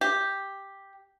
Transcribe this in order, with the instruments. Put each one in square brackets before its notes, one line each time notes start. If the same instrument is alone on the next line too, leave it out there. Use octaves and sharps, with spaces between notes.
[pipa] G4